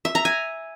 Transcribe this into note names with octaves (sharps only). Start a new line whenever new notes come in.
E5
A#5
G#5